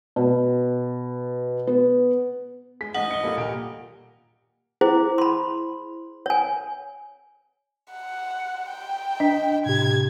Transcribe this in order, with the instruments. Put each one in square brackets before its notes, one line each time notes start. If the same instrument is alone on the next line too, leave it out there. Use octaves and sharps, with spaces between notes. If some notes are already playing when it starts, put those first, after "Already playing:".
[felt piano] B2
B3
[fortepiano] G#3 [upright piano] B6
[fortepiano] A1 G#2 [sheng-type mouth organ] D#5 [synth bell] F#5 [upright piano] F#7
[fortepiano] A1 [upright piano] C#7 G7
[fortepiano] A#1 A#2 B5 [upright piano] G3 A#3 A4
[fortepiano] D#2 G4 A#4 [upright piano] A#2 D7
[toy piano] E4 G#4 C5
B5 C6
C#5 G#5
[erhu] F#5
G5
[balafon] D4 [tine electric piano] D#5 B6
[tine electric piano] A2 C3 G4 [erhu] G#6